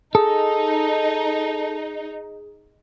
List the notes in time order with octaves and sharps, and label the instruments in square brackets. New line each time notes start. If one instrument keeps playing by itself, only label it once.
[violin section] D#4 [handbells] G#4 [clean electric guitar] A4